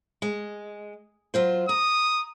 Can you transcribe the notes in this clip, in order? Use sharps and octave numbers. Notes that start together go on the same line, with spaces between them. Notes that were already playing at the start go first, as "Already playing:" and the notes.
G#3
F#3 F4 C5
A#5 D#6